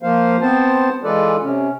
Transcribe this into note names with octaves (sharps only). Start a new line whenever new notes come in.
F3 A#3 C5 F5
B3 C4 C5 A5
E3 G#3 F4 A4 B4 D5
C3 C#4